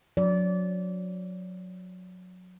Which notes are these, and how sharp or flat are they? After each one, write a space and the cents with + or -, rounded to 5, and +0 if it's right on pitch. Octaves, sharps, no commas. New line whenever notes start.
F#3 -25 D5 -25